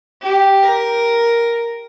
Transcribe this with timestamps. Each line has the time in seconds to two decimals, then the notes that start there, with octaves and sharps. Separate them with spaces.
0.22 G4
0.63 A#4